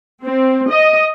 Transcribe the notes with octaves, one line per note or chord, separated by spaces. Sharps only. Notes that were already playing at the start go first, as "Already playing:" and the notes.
C4
D#5